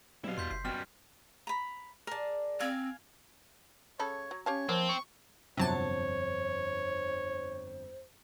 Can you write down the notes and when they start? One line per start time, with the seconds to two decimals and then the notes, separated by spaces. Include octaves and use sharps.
0.24 B2 F#3 G3 E4 F5
0.38 E2 C6 G6 B6
0.51 F#1 C7
0.65 F#2 B2 G3 G5 F6
1.47 A#5 B5
2.07 G#4 A#4 D5 A5
2.60 C4 F5 G#5
3.99 C#3 A4 C#5 B5
4.31 F#3
4.46 C#4 G4 C#5 F5 A5
4.69 F3 A#3 C4
4.89 C#6
5.57 G1 F2 C3 F#3 C5 C#5 A5 G6